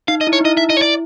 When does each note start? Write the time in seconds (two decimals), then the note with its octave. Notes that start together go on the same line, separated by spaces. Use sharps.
0.08 D#4 F5
0.21 D#5
0.27 E4
0.33 C#5
0.41 D#4
0.45 E4 D#5
0.57 E5
0.70 D#5
0.77 C#5
0.82 D5